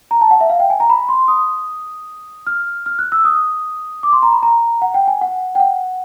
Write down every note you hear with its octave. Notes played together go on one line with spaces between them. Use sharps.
A#5
A5
F#5
E5
F5
G5
G#5
A#5
B5
C6
D#6
F6
F6
F#6
E6
D#6
D6
C6
A#5
B5
A#5
F#5
G5
G#5
F#5
G5
F#5